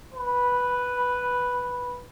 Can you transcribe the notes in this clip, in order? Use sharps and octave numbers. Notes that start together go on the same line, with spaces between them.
B4